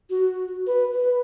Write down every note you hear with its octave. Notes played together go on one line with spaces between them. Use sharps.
F#4
B4
B4